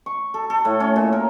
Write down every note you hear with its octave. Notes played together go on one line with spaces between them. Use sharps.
C#6
A4
A4
A2
C#4
A#2
A#4